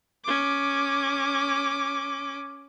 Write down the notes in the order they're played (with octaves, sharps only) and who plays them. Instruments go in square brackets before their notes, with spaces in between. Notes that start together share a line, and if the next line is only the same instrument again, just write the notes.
[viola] C#4 D6